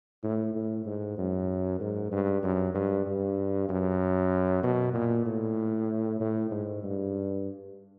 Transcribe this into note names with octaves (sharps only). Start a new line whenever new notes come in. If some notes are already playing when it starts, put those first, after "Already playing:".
A2
A2
G#2
F#2
G#2
G2
F#2
G2
G2
F#2
B2
A#2
A2
A2
G#2
G2